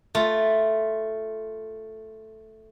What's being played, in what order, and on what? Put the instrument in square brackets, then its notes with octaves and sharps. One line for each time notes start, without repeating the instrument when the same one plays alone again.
[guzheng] A3 F4